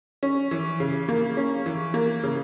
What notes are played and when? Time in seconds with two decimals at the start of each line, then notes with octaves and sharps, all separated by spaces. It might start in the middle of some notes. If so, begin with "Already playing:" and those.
0.23 C#4
0.51 E3
0.80 C#3
1.09 A#3
1.37 C#4
1.66 E3
1.94 A#3
2.23 C#3